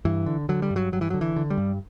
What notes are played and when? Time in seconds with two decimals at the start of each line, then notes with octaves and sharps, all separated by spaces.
0.05 G2 E3
0.26 D3
0.49 D3 F#3
0.62 G3
0.71 G2
0.76 F#3
0.92 G2 F#3
1.01 E3
1.10 F#3
1.14 D3
1.21 E3
1.36 D3
1.50 G3
1.58 G2